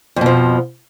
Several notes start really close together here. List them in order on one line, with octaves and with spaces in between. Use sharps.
F2 B2 F3